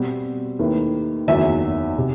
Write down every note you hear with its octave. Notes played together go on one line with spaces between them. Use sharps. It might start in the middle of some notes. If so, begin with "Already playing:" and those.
Already playing: B2 G3 C4 F#4
D#2 D#3 A3 E4 B4
F#1 E2 D#3 F#3 E5
C3